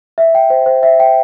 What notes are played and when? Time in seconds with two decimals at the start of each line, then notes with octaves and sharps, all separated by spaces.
0.18 E5
0.35 G5
0.50 C5
0.66 C5
0.83 E5
1.00 G5